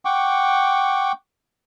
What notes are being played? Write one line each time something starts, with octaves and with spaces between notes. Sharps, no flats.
F#5 G5 C#6 D6